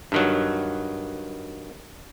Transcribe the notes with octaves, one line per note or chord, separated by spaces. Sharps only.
G2 D#3 F#3